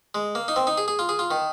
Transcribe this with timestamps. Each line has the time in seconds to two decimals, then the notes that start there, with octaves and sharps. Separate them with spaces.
0.15 G#3
0.35 A#3
0.48 D#4
0.56 C4
0.67 D#4
0.78 G#4
0.88 G#4
0.99 F4
1.09 G#4
1.19 F4
1.31 D#3